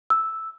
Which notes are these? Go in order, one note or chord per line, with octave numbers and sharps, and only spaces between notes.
E6